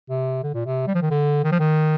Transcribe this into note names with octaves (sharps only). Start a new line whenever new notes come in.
C3
D3
A#2
C3
G3
F3
D#3
D3
D#3
F3
D#3